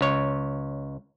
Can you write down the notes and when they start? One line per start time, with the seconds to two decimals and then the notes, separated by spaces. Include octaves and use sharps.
0.01 C#2 C#5